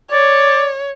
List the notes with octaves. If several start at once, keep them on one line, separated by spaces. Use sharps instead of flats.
C#5 D5